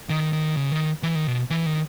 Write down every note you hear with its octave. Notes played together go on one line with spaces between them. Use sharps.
D#3
D#3
C#3
D#3
E3
D#3
B2
E3
D#3